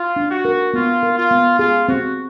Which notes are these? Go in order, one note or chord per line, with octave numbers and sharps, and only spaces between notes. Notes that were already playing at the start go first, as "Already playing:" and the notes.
Already playing: F4
D4
F#4
A#4
B3 F4
A#4
F4
B3
F4 G#4
C4 F#4